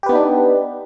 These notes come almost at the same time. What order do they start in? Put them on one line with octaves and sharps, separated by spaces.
G4 B4 B3 D#4 D4